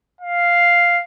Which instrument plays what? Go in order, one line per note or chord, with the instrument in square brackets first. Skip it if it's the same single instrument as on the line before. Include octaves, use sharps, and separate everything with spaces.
[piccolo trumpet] F5